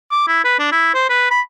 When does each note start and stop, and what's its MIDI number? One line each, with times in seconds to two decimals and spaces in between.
0.11 0.24 86
0.27 0.43 64
0.45 0.57 71
0.59 0.68 62
0.72 0.93 64
0.94 1.09 72
1.10 1.27 71
1.31 1.41 83